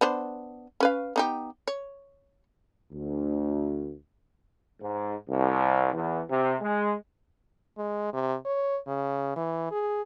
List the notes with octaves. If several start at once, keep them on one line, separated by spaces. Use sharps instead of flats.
B3 D4 C5
C#4 B4 F5
B3 D#4 G4
C#5
D2
G#2
C2
E2
C3
G#3
G#3
C3
C#5
C#3
E3
G#4